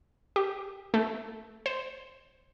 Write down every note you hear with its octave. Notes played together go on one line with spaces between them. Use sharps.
G4
A3
C5